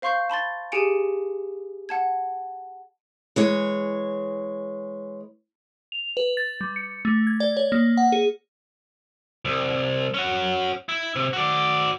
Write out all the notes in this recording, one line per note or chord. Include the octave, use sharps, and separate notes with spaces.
C5 F5 C6 C#6 G6 C7
A5 B5 C6 A6
G4 G#4 G#5 C#7 D7
F#5 A5 G#6
E3 G#3 C#5
F7
B4
A6
G3
C#7
A3
G#6
D5
C#5
A#3
F#5
G#4
C2
C#4 F#4
E4
C3
F#4 D5